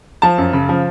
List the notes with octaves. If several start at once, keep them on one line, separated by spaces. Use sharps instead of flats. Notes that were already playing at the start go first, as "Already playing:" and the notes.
F3 A5
F#2
C#3
F3